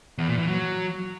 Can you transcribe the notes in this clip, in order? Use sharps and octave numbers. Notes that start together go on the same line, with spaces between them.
E2
A#2
E3
F#3